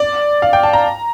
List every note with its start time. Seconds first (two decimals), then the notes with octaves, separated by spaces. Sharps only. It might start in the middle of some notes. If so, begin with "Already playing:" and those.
Already playing: D5
0.42 F5
0.53 G5
0.63 A5
0.73 A#5